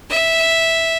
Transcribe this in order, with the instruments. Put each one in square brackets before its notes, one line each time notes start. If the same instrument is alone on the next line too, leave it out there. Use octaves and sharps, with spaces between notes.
[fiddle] E5